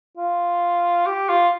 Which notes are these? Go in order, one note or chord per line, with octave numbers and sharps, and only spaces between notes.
F4
G4
F4